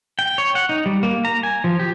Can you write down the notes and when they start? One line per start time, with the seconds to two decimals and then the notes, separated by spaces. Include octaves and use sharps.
0.19 G5
0.38 C#5
0.55 F#5
0.69 D#4
0.86 G3
1.03 A#3
1.25 A#5
1.43 G#5
1.64 F3
1.80 G4